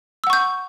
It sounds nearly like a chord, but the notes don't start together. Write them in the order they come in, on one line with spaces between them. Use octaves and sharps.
E6 F#5 C#6 G6